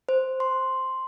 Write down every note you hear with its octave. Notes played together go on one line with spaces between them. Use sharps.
C5
C6